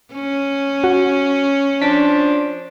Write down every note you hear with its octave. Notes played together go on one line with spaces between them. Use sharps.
C#4
F#4
F3 D4 B6